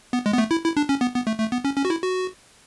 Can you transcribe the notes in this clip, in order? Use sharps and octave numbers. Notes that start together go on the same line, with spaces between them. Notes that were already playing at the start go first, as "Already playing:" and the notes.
B3
G#3
B3
A3
E4
E4
D4
C#4
B3
B3
A3
A3
B3
C#4
C#4
F#4
E4
F#4